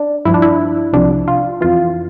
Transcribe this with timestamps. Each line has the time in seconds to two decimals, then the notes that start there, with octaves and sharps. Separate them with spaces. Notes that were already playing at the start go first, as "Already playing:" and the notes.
Already playing: D4
0.25 G2 F3 E4
0.34 D4
0.42 E4
0.93 C2 C3 F3 D4
1.28 F4
1.61 F2 E3 F4